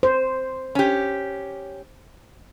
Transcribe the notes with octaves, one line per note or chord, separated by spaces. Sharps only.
C5
C#4 G4